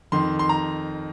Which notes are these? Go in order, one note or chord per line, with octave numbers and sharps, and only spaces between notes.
F2 D#3 C6
C6
A#5